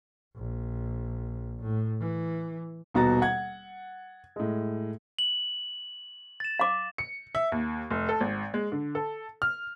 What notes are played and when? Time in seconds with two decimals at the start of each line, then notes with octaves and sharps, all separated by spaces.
0.36 A#1
1.62 A2
2.00 E3
2.94 D#1 B2 F#4 A#5 A6
3.22 F#5 G#6
4.36 A2 G#3
5.19 F#7
6.40 A6 E7
6.60 F5 D6
6.98 C#7
7.35 E5
7.52 D#2
7.91 F1
8.09 A4
8.21 G#1
8.54 G#3
8.72 D3
8.95 A4
9.42 F6